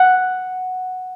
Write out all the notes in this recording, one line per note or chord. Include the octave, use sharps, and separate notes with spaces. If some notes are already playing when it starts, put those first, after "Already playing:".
Already playing: F#5